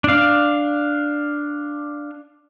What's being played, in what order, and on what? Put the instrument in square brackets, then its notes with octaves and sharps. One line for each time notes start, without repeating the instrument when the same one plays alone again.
[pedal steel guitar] D4 F5